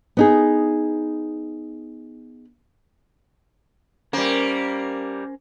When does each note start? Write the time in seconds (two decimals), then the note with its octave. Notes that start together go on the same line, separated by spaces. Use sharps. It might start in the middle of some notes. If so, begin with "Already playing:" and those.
0.17 B3 D#4 G#4
4.13 G3 A#3 C#4 A#4 C5